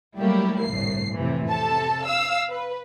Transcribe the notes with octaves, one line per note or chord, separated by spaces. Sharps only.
F#3 G3 A3 A#3 E4 G4
G1 C2 A2 C7
F2 A2 C3 E3
C3 A4 A5
F5 E6
B4